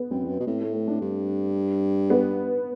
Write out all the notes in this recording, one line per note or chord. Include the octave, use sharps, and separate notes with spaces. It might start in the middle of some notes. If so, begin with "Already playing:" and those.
Already playing: B3
F#2 C4
E2
F#2
B2
A2 C4
A3
A3
D4
G2
B3